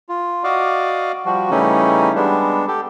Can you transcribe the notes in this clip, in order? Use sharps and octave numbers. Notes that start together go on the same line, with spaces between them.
F4
F#4 D5 D#5 F5
F3 G3 F#4
C#3 E3 G3 A3 C#4 D#4
G3 G#3 B3 D4
G4 A4